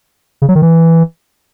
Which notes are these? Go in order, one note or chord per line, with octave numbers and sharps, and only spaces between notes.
C#3
F#3
D#3
E3